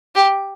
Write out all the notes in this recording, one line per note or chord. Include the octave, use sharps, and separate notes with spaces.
G4